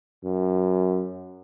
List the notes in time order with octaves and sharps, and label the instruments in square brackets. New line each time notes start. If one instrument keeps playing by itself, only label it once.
[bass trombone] F#2